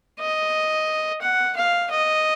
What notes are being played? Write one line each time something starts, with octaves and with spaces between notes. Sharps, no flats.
D#5
F#5
F5
D#5